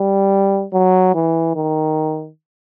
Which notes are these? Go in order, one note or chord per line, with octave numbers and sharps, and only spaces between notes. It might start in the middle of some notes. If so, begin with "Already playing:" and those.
Already playing: G3
F#3
E3
D#3